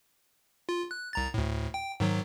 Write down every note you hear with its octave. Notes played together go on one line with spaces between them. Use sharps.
F4
F#6
C2 A#5 A6
D2 A2
G5
G#2 D#3 F#3